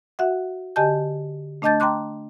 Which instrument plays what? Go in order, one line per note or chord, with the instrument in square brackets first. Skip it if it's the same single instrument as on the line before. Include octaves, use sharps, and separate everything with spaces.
[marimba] F#4 E5 F#5
D3 G4 D#5 G#5 A5 G6
A3 D4 D#5 A5 G6 A6
G5 A#5 C6 D6 F#6